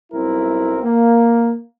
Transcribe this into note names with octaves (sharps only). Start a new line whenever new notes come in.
B1 G3 C4 E4 A#4
A#3